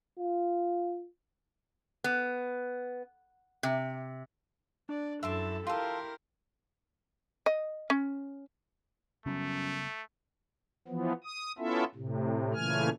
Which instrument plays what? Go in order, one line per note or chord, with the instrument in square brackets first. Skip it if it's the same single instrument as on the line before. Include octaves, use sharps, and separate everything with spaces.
[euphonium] F4
[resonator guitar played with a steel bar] B3
C3
[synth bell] D4 [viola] D5
[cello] F#2 E4 [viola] A4 A5 [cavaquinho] E5 C6 D6
[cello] E4 G4 [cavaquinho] F4 A4 [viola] A#4 F5 [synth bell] C6
[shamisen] D#5
C#4
[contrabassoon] F#2 [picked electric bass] C#3 G3 B3 [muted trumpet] A3
[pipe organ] E3 F3 B3
D#6
B3 C#4 E4 F4 A4 E5
A2 C3
A#2 C#3 E3 A3 G#5 F6